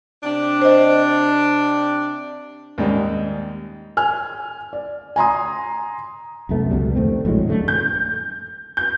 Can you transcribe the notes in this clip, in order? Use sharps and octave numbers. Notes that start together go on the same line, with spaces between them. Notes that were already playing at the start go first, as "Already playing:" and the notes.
C3 D4
C5 D#5
D#2 G#2 G3 D#4
G#5 F6
D5
G#5 A#5 C6 D#6
C2 F#2 A3 B3
C#2 F#2 B2 G3
F2 D#3 A3 C4
A#1 A2 F#3 G#3
F#2 D3 A3
G6
G6